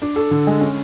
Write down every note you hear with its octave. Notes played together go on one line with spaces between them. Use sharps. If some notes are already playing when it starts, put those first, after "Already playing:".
D4
A4
D3
G#3
C#4